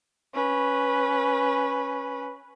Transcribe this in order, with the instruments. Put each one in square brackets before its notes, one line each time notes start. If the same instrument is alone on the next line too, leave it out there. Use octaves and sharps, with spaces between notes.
[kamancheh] C#4 B4